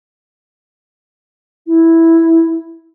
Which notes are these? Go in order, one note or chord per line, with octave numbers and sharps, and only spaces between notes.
E4